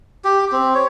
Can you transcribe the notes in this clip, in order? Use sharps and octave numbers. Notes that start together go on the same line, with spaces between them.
G4
C4
C#5